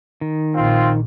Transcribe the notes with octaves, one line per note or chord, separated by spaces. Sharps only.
D#3
A#1 A#2 C4 F4